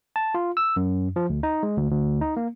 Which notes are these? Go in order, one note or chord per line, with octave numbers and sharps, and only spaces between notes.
A5
F4
E6
F#2
F3
D2
D#4
G#3
D2
D2
D#4
A#3